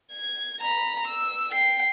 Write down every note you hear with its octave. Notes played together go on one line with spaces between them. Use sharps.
G#6
A#5 B5
E6
G5 C7